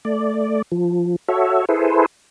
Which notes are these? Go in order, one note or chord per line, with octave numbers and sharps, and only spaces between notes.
A3 D5
F3
F#4 A4 C#5 E5
E4 G#4 A4 B4 C5